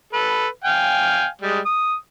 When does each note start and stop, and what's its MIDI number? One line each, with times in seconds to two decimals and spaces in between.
0.13 0.47 69
0.13 0.47 71
0.64 1.27 77
0.64 1.27 79
0.64 1.27 80
1.41 1.60 55
1.41 1.60 56
1.66 1.94 87